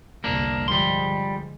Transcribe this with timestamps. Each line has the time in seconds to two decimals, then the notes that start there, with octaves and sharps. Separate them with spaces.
0.24 G1 C2 F2 A#3 D4
0.68 D3 F3 G3 G#3 C6